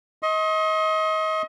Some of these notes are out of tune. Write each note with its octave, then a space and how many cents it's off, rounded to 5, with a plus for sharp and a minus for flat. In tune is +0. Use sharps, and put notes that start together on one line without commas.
D#5 +30 C6 +45